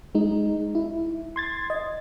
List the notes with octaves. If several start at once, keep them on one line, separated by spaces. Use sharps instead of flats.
G#3 D#4
E4
C6 G#6 A6
D#5